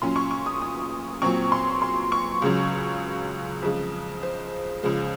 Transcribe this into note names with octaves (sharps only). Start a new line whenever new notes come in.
A#2 F#3 C#4 C6
C#6
C#6
D#6
D#6
A#2 F#3 C4 C#6
C6
C6
C#6
C#2 C#3 F#3
F2 C#3 G#3
C5
C#2 C#3 F3 G#3